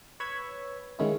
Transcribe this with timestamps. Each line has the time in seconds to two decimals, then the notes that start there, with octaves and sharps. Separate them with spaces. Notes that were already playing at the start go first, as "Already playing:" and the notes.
0.20 B4 C#5 B5 E6 G#6
0.99 D#3 G#3 A#3 C#4 D#4 E4